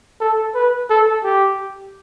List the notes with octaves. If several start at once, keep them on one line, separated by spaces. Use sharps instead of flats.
A4
B4
A4
G4